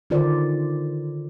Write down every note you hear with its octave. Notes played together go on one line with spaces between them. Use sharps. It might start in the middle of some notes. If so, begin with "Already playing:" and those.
D3 D#3 F4 A#4 C5 D5